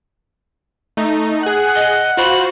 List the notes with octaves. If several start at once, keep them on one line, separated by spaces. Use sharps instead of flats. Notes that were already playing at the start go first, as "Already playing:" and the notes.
A3 D#4
G#4 F#5 F#6
D#5
F4 F#4 C5 B5